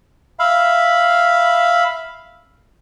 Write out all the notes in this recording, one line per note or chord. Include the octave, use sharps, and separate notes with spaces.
E5 F5 B5